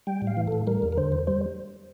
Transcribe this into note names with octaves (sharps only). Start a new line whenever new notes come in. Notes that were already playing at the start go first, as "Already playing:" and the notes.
G3 G5
A2
F5
E3
A2 A4
G3 A#4
E2
A#4
D3 C5
E2
G3 C5